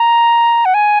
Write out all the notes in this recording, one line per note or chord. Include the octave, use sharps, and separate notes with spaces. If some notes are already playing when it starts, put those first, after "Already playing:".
Already playing: A#5
F#5
G#5